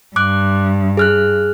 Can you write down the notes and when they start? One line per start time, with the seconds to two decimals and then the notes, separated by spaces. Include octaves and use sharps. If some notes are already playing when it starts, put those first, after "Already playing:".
0.16 G2 D6 F#6
0.97 G#4 F6 F#6